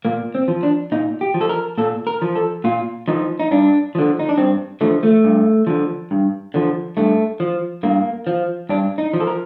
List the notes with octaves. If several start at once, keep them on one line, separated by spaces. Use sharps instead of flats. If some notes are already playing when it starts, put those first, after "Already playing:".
A#2 A#3
C4
F3
D4
A#2 D#4
G4
F3
A4
A#4
A#2 A4
A#4
F3
A4
A#2 F4
F3 D#4
D#4
G2 D4
D3 F3
D#4
D4
G2 C4
D3 F3 A3
A3
G2
D3 F3
G2
D3 F3
G2 A3
F3
G2 A#3
F3
G2 D4
D#4
F3
A4
A#4